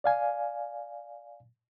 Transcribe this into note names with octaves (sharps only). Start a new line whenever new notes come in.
D5 F5 G#5